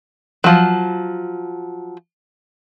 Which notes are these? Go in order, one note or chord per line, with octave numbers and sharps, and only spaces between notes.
F3 F#3